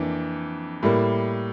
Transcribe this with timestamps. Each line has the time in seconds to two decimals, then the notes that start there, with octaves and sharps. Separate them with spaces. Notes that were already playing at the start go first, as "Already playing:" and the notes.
Already playing: F2 E3 A#3 D4
0.83 A2 G3 A#3